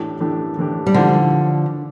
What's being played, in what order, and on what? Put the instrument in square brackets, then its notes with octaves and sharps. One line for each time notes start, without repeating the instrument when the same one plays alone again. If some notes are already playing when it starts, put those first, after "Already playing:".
Already playing: [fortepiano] A2 E3 A3 D4 G4
A2 E3 A3 D4 G4
A2 E3 A3 D4 G4
[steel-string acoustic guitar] G3
[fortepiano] A2 E3 A3 D4 G4 [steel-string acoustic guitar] D3 F3